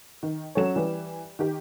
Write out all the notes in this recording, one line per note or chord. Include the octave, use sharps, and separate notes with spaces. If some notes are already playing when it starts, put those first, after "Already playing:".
D#3
F#3 C#4 A4 C#5 E7
E3 G3
D#3 G4